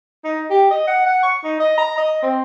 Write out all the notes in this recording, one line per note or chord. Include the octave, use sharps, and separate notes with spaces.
D#4
G4
D#5
F#5
F#5
C#6
D#4
D#5
A#5
D#5
C4